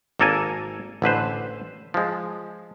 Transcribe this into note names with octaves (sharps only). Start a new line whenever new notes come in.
G#1 A#3 A4 A#4 G#5
A1 D3 B4 C5
F3 G#3